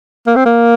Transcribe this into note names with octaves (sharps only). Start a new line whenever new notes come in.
A#3
C4
A#3